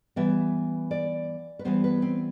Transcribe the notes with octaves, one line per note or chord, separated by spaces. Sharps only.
E3 G3 B3 E5
D5
B4
E3 G3 B3 C5
B4
C4